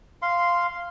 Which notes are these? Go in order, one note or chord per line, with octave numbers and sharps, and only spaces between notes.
F5 C6